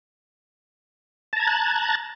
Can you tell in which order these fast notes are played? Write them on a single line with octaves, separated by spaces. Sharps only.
A5 A#5 G#6 A6 F#6